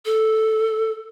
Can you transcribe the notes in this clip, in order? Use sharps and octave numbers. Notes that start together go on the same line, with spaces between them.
A4